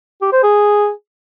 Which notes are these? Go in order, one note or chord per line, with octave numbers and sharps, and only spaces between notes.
G4
C5
G#4